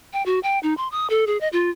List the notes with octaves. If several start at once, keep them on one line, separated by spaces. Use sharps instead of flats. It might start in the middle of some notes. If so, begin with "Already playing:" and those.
G5
F#4
G5
D#4
C6
D#6
A4
G#4
D#5
F4